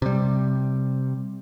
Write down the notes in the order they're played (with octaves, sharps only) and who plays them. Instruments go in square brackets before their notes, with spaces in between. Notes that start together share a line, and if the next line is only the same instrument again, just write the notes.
[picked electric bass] C3 G3